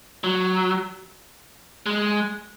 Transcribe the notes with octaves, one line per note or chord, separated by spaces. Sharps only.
F#3
G#3